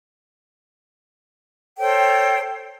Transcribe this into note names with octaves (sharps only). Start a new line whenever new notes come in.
A4 C5 C#5 G5